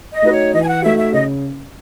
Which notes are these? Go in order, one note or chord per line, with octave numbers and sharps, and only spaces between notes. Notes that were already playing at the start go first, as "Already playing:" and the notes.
D#5
A3 D#4 F#4 B4
C#5
E3 D#5
G#5
F#5
A3 D#4 F#4 E5
E5
C#3 D#5